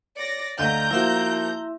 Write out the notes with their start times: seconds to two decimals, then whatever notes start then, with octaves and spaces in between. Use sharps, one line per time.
0.17 C#5 D5 A#6
0.59 D2 A3 D5 D#5 F5 A#5 G6
0.91 F3 A#3 E4 F#4 E5 C6